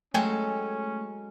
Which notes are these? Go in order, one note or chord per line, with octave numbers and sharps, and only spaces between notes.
F#3 G#3 A3 C#4 A4 C#5 G5 G#5